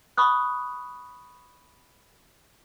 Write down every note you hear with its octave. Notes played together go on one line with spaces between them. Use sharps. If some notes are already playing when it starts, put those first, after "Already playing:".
B5 C#6 D#6 F#6